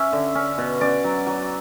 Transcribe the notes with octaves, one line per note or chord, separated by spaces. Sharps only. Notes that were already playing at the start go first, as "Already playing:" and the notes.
Already playing: C#4 E5
D3
C#4
B2
C#4 D5
F#3
F#3